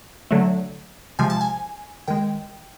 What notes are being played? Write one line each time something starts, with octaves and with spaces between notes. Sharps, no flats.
D3 F#3 A3
C3 F3 G#3 G#5
A5
G#5
D#3 G#3 G5